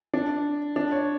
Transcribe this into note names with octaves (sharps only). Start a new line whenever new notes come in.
D4
D4
C#5